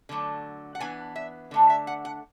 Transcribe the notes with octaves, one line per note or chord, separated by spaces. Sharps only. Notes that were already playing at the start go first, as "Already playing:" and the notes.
D3 F#3 A3
F#5
E3 B3 D4 G#5
E5
D3 A3 D4
E5
F#5
F#5